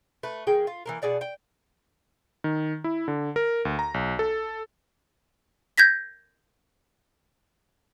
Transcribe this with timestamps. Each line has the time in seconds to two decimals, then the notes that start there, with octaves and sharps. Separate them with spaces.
0.23 A3 B4
0.47 D#3 A#3 G#4 G5
0.67 F4
0.86 E3 A#3 A#4
1.02 B2 G#4 D5 F#5
1.21 G5
2.44 D#3
2.84 E4
3.08 D3
3.36 A#4
3.65 D2
3.79 A#5
3.94 B1
4.19 A4
5.78 G6 G#6 A#6 B6